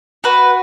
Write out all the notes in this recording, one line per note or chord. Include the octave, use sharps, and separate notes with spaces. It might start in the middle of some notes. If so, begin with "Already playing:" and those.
F#4 B4